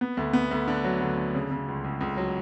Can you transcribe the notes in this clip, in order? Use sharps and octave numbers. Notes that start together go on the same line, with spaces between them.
B3
D2
B3
D2
D3
F#3
D2
D3
C#3
C#3
C#2
C#2
C#2
F#3